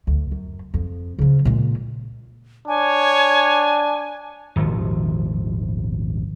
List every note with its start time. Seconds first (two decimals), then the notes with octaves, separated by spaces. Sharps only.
0.07 D2
0.32 F#2
0.74 F2
1.19 C#3 F3
1.45 A#2 G#3
2.68 D4 C#5 G#5
4.56 D#1 G#1 D#3 F3